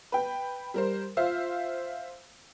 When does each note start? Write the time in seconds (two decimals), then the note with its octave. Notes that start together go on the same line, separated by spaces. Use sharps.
0.12 B4 G5
0.74 G3 A#4 C5
1.17 F4 C5 E5 F5